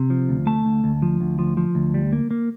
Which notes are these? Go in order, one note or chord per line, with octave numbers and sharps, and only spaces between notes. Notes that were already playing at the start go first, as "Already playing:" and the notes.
Already playing: C3
F3
D2
A3 A5
D2
D2
F3
D2
F3
F3
D2
G3
A#3
A#3